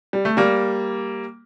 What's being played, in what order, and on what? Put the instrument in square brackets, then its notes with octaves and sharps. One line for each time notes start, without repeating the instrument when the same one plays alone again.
[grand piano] G3
A3
G3 A#3